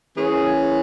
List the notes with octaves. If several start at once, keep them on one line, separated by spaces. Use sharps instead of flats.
E3 A#3 C#4 G#4